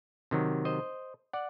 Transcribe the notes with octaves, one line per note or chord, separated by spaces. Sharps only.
C3 D#3 F#3
C5 D#5
D5 F#5